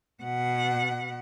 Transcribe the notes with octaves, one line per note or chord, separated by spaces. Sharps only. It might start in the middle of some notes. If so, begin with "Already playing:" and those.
B2 F#5